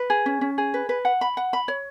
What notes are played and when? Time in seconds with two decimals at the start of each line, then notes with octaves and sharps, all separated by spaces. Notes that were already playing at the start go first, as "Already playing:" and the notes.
Already playing: B4
0.10 G#4
0.26 C#4
0.41 C#4
0.58 G#4
0.74 B4
0.89 B4
1.05 F#5
1.21 B5
1.37 F#5
1.53 B5
1.68 C#5